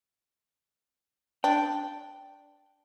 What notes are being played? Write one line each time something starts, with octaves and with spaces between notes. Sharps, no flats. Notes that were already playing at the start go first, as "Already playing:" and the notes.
D4 G5